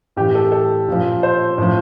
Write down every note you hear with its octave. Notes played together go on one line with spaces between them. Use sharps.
A2 E3 G4
A4
A4
A#2 F3
C5
A2 F3